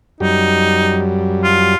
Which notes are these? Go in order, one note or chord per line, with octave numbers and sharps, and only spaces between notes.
F#2 G3 D#4
F4